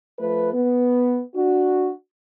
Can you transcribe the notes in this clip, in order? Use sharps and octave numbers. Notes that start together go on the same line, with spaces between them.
F3 A3 B4
B3
D4 F#4